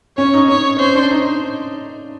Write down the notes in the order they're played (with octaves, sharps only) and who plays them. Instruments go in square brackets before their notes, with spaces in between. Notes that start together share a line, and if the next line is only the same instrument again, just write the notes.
[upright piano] C#4 [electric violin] C#5
[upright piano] D#4
[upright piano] C#4 [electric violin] C#5
[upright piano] C#4 [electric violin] C5
[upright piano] D4
D#4